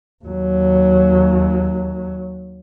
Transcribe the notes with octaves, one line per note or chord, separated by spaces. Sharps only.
D#2 F#3